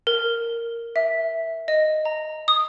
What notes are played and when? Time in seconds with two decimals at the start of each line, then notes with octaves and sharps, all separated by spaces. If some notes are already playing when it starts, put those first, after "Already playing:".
0.07 A#4
0.96 E5
1.68 D#5
2.05 A#5
2.48 D#6